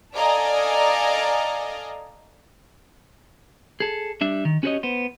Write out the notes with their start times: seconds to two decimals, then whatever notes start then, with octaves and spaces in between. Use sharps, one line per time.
0.15 A4 D5 D#5 F5 G#5 A#5
3.80 G#4 A4
4.21 G3 D4 E5
4.45 D#3
4.63 C#4 F#4 G4 B4 C#5 D#5
4.83 B3 C5